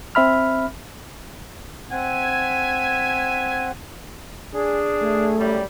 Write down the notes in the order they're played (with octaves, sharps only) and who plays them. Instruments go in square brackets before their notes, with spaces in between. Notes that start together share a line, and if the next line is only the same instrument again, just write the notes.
[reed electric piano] C4 E5 B5 F6
[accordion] C4 F#5 [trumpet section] E5 G#5
[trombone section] D4 G#4
[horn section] A3
[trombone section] F#2 G3